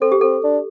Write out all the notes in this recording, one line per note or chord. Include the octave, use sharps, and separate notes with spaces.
C4 A4
G4
C4 A4
D4